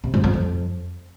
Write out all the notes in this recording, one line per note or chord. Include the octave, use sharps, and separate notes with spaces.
C3
G#2
F2
F2